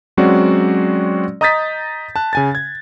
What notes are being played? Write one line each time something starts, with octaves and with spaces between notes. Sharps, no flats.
F#3 G#3 C4 C#4 F#4 D5
D#5 A#5 D#6 G6 A6 B6
A5 F#6
C#3 G#5 A6
G#6